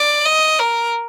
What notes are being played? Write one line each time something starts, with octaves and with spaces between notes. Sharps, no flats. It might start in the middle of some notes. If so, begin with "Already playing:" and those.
Already playing: D5
D#5
A#4